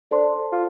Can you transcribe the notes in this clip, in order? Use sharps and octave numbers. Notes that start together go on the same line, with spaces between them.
D4 A4 C5 A5 C6
F4